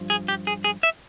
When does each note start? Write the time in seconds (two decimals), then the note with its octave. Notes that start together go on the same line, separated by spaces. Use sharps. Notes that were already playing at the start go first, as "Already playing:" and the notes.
Already playing: G2 F3
0.10 G#4
0.28 G4
0.47 G#4
0.64 G#4
0.83 E5